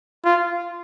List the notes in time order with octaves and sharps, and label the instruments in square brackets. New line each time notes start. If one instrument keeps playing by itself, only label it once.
[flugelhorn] F4